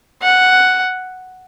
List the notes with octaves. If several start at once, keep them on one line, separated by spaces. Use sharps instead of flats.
F#5